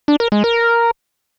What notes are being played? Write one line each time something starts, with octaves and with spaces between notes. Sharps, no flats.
D4
A#4
G#3
A#4